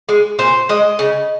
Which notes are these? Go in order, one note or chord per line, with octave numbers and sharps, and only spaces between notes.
G#3
A#2 C5
G#3 D#5
C#3